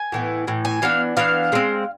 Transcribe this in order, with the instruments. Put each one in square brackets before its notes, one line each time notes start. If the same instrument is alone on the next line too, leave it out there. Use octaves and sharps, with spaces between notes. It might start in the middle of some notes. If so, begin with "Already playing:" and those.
Already playing: [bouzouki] G#5
A2 E3 B3
A2 E3
G#5
E3 B3 D4 F5
E3 B3 D4 F5
D3 G#3 C4